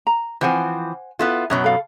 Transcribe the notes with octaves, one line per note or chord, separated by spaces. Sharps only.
A#5
E3 F3 C4 C5 F#5 G#5
B3 E4 F4 A4
F#2 B2 F#3 C#5
A4 F5